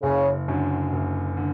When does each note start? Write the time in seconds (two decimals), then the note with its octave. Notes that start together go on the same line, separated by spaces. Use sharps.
0.02 F#1 C#3
0.48 F#2 D3
0.93 F#1
1.37 D3